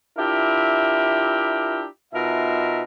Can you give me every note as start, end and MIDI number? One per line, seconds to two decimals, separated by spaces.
0.17 1.86 62
0.17 1.86 64
0.17 1.86 65
0.17 1.86 67
0.17 1.86 70
0.17 1.86 76
2.13 2.81 47
2.13 2.81 63
2.13 2.81 65
2.13 2.81 70
2.13 2.81 76